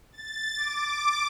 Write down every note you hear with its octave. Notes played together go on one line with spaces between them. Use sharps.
A6
D6